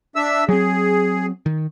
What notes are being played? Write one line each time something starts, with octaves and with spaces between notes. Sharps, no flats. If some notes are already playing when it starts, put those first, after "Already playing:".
D4 E5 E6
F#3 C4 G#4
D#3